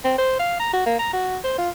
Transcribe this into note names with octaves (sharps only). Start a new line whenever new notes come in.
C4
C5
F5
A#5
F#4
A#3
A#5
F#4
C5
F4